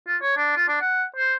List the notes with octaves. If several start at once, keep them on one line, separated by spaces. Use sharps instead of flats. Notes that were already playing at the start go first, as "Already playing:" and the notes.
F4
C#5
D4
F4
D4
F#5
C5